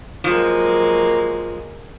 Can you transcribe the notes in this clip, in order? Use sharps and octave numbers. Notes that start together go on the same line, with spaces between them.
F3 F#3 G#3 A#3